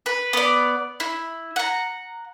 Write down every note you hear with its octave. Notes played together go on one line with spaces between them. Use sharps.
B4
B3 D5
E4
F#5 A#5